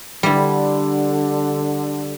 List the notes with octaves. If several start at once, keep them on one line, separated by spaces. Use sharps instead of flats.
D3 G3 E4